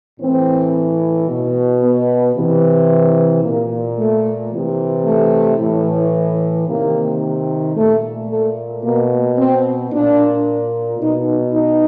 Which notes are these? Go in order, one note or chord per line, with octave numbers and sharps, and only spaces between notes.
A2 E3 C4
B2
B3
C3 E3
A#2 A#3
A3
C3 E3
A3
A2 E3
C3 D#3 A#3
A#2 A3
A3
B2 A#3
C4
A#2 D4
B2 D#4
D#4